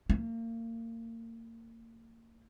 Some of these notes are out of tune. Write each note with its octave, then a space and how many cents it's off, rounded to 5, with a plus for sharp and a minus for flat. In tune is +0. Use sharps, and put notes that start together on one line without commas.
A#3 -35